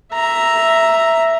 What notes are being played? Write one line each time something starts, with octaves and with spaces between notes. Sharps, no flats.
E5 A#5